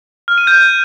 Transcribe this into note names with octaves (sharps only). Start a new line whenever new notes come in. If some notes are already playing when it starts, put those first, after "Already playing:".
F6
D#7
G6